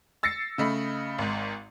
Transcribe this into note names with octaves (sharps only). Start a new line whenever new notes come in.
E6 A6 A#6 C7 C#7
C#3 A3 D#5 B5
G#1 G#2